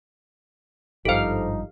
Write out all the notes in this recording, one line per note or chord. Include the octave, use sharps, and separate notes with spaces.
G#1 G2 F3 D#4 G4 A4 C5 F5